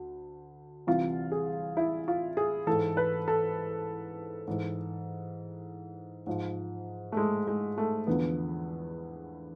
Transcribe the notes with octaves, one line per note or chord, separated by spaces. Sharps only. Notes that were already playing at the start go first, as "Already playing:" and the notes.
Already playing: D2
C2 C3 E3 F4
G#4
E4
F4
G#4
G#2 E3 A4
B4
A4
G#2 E3
G#2 F3
A3
G#3
G#3
A3
E2 D3 F3 B3